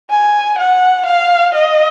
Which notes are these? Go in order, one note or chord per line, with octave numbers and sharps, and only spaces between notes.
G#5
F#5
F5
D#5